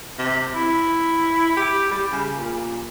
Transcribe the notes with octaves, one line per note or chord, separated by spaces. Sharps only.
C3
E4
G4
G3
C#3
A#2